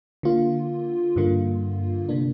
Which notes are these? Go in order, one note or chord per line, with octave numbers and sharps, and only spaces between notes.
D3 A#3 F4
G2 D3 A#3 F4
C3 A#3 D4